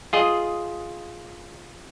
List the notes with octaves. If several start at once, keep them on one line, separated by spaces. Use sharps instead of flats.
F4 G#4 D#5